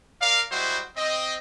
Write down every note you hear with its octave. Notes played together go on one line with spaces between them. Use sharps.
A#4 D5 F5
G3 G#3 E4 F#4 C5
C4 D#5